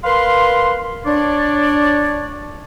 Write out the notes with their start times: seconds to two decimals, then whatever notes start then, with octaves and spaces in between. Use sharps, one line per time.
0.03 A#4 B4 F5 C6
1.06 D4 C#5 D5